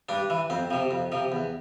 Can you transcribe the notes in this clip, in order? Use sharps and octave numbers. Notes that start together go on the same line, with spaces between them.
G2 D4
E3
F2 C4
C3 F3
F2
C3 F3
E2